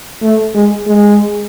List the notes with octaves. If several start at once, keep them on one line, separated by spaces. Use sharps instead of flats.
A3
G#3
G#3